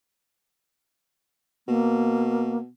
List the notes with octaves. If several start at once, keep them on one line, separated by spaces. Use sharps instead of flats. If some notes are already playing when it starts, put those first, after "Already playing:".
B2 A#3